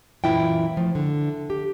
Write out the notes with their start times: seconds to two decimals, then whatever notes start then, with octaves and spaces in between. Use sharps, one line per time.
0.24 F#2 A#2 E3 E4 F4 G5
0.77 F3 A3
0.95 D3
1.50 G4